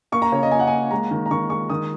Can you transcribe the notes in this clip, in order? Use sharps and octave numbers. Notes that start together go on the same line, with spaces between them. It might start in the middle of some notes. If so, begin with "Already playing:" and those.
A#3 C#6
A#5
C#3 C#5
D#5
A#3 G#5
F#5
A#3 G#5
G#3 A#5
D#3
A#5
D#3 C#6
G#3 C#6
D#3 D#6